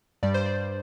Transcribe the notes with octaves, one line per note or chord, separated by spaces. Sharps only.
G2 G3 D5
C5
D5